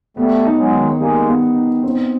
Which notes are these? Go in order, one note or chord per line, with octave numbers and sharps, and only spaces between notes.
G3 A3 B3
D#4
F#3 G#3
D#3
G3 G#3 A#3
B3
D#4
C4